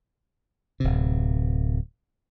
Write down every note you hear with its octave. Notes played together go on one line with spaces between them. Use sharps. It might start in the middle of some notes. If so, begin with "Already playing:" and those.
D1 C3